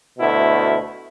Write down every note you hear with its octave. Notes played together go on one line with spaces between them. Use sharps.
D2 B2 E4